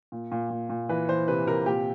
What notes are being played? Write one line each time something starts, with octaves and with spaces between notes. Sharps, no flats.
A#2
A#2
A#2
A#2
E3 B4
E3 C5
C3 B4
C3 A#4
A#2 G4